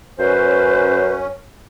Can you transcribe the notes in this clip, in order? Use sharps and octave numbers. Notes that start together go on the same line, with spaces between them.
F#2 C#4 B4 C5